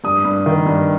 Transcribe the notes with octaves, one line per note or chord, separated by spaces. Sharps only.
G2 D#6
G2
D#3
G2